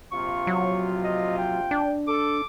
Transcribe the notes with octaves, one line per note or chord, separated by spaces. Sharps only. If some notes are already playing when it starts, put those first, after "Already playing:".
A#1 C3 F4 C#6
F#3
D#5
G5
D4
A4 D6